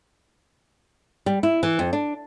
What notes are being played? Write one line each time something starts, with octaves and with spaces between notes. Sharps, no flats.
G3
E4
E3
F2
D4